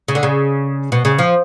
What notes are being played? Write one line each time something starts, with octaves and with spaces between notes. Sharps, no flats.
C#3
D3
C#3
B2
C#3
F3